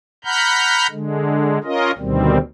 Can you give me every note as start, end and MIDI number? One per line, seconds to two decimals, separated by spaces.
0.25 0.87 78
0.25 0.87 82
0.25 0.87 83
0.25 0.87 89
0.25 0.87 91
0.91 1.58 50
0.91 1.58 56
1.64 1.91 61
1.64 1.91 65
1.64 1.91 70
1.64 1.91 75
1.98 2.38 38
1.98 2.38 47
1.98 2.38 51
1.98 2.38 55
1.98 2.38 60